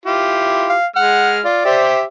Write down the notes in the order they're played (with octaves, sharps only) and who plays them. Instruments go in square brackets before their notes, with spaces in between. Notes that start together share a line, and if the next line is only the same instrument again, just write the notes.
[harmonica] E4 F4 G4
[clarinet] F5
[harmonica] G#3 F6 [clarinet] F#5
[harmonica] F4 [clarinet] D5
[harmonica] G4 C5 E5